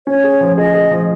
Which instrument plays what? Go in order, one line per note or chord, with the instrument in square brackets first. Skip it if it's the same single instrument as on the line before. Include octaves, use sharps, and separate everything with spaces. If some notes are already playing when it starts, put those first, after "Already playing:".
[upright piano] C#4 [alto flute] C#5
[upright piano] G#4
F3
[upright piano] G#4 [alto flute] D#5
[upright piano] G#4
F3